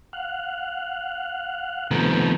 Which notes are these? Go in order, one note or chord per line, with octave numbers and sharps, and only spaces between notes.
F5 F#5
C3 D#3 F3 A3 B3